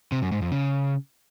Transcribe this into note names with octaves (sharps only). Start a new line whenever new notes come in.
C3
F#2
G#2
F2
C#3